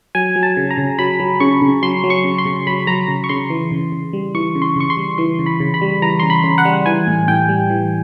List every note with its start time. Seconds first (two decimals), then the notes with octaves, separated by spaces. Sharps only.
0.15 F#3 G#5
0.36 F#3
0.43 A5
0.57 C#3
0.71 A#5
0.78 C#3
0.99 F#3 B5
1.20 F#3
1.40 C#3 C#6
1.62 C#3
1.82 F#3 C6
2.04 F#3
2.10 C#6
2.24 C#3
2.38 C6
2.45 C#3
2.67 F#3 B5
2.87 F#3 A#5
3.08 C#3
3.24 C#6
3.29 C#3 C6
3.50 E3
3.71 C#3
3.92 C#3
4.13 G3
4.34 E3 C#6
4.55 C#3
4.62 C6
4.76 C#3 C#6
4.90 C6
4.97 G3
5.18 E3 C6
5.39 C#3
5.46 B5
5.60 C#3
5.74 B5
5.81 G3
6.02 E3 A#5
6.20 C#3 C6
6.30 B5
6.44 C#3
6.58 F#5
6.65 G3
6.86 E3 G#5
7.07 A2
7.28 A2 G5
7.49 G3
7.70 E3